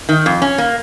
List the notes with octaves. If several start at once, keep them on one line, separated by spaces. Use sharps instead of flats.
D#3
F2
C#4
A#3